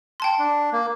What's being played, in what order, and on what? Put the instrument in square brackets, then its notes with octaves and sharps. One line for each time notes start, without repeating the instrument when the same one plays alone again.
[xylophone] G5 A5 C6
[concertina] D4
A#3